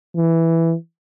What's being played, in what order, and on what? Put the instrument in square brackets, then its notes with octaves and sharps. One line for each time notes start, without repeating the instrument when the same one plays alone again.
[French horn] E3